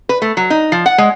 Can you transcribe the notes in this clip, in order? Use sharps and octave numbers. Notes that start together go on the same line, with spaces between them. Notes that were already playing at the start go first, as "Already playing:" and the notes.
B4
A3
F#3
D#4
F3
F#5
G#3